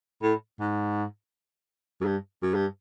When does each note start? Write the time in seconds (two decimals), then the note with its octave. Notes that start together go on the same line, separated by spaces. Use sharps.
0.23 A2
0.60 G#2
2.01 F#2
2.05 G2
2.43 F#2
2.55 G2